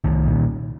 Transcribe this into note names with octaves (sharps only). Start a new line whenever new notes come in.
C2 D#3
A#2